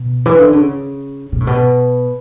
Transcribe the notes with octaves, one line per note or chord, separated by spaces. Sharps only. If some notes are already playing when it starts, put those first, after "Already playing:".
Already playing: B2
E3
D3
C#3
B2
A2
B2